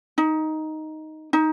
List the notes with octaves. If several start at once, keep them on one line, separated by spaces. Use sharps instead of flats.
D#4
D#4